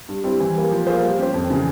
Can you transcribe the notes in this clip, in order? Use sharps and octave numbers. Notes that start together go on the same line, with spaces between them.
G2
G3 C4 E4
E3
G3 A#3
F3
A#3 F4 G#4 C5
G3
C#4 G4 C5
F2
C#3 E3